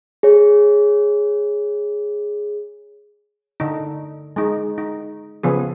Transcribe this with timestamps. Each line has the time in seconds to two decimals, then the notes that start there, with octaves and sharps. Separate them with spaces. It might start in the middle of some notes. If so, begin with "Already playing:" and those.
0.23 G#4 C#5
3.60 D3 D#4
4.36 G#3 D#4
4.78 D#4
5.43 C#3 F3 B3 G#4